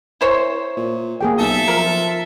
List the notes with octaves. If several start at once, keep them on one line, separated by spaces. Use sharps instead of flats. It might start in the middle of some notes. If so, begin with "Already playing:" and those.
E4 C5 C#5
A#2
A#3 G#4 G5
B1 A4 E5
F3 A#4